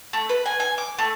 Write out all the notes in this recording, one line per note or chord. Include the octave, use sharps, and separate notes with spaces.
A3
B4
G#5
G#5
D6
A3